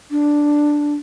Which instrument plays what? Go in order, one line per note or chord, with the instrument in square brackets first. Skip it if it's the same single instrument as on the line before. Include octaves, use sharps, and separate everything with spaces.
[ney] D4